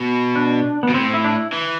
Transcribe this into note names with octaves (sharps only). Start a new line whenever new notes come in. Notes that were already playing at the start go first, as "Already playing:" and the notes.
Already playing: B2
D4
B3
B2
A2 C4
E4
D4
E4
E3